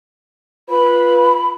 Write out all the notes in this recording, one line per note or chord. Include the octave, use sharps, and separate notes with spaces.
F4 B4 B5